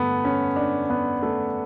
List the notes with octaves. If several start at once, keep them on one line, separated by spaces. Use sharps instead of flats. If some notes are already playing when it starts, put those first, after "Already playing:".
Already playing: G2 D3 A3 B3
C#4
D4
B3
A3